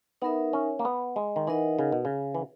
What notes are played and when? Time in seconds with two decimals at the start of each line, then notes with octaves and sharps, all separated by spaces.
0.22 B3 D#4 A#4 E5
0.53 C#4
0.79 A#3
0.85 B3
1.16 G#3
1.36 D#3
1.47 E3 D#4 A#4 D#5 F#5
1.79 C#3
1.92 B2
2.05 C#3
2.35 E3